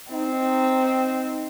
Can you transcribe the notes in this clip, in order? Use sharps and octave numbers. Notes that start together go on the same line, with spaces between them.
C4 D#4